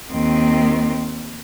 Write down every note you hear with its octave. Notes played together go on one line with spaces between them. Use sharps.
D#2 D#3 C4